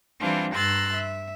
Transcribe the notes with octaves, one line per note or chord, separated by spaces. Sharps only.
E3 G3 C4 D4 F4
G2 A#5 C6 E6 F#6 A6
E5